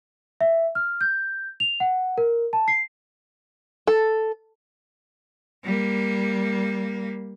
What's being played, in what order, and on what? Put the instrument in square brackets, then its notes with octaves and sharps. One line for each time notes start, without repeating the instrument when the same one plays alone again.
[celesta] E5
F6
G6
F7
F#5
A#4
A5
C7
[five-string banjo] A4
[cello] G3 A#3